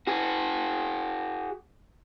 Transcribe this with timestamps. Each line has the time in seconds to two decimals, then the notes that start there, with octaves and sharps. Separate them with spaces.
0.07 F#4 G#4